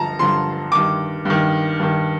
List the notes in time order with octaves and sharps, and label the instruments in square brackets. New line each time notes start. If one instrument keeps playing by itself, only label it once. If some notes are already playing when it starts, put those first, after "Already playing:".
Already playing: [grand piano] G2 D3 F3 A5 A#5
G2 D3 F3 C6
G2 D#3 D6
G2 D#3
G2 D#3